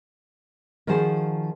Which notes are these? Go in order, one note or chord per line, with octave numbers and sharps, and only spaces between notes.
D#3 F3 F4 F#4 G#4 C5